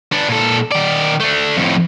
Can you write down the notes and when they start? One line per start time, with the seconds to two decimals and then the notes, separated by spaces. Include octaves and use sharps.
0.12 B3 D4
0.29 A#2 A4
0.72 D#3 D5
1.20 A3 D4
1.57 F2 A2